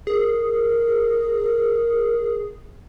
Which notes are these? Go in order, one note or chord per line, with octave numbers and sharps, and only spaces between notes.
G#4 A#4